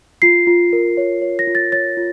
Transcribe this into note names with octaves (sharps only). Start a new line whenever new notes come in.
F4 C7
F4
A#4
C#5
C#5
A#6
F4
A6
C#5 A6
F4